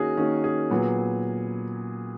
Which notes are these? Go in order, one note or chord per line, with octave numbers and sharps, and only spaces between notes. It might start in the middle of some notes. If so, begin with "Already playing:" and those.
Already playing: D#3 A#3 C#4 F#4 G#4 A#4
D#3 A#3 C#4 F#4
G#4
A#2 F#3 B3